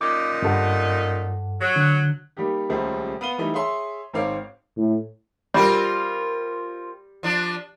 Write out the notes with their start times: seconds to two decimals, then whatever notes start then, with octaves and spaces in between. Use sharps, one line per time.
0.01 F#2 A#2 D#4 D6
0.42 G2 A4 F#5
1.61 F#3
1.76 D3 F#6
2.37 G3 A#3 D#4 G4
2.70 D#1 C#2 G3 A3 G#4 C5
3.21 B3 F5 D#7 G7
3.38 E3 G3 A3 D#4
3.54 G#4 C#5 E5 C6
4.13 G#1 G#2 C4 C#5 F5 D6
4.77 A2
5.54 G3 C4 F4 A#4
7.23 F3 D4